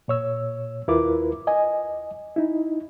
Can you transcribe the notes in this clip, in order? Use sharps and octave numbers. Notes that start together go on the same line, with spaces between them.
A#2 C#5 E6
D#2 E4 F4 A#4 B4 D6
D#5 G#5
D#4 E4